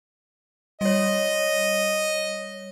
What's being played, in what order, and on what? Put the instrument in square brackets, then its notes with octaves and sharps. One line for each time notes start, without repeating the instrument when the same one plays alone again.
[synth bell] G3 C#5 [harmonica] D#5